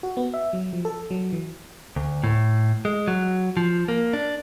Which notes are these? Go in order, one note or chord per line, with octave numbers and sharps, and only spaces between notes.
F#4
B3
E5
F#3
F3
A4
F#3
E3
D2
A2
G#3
F#3
F3
A#3
D4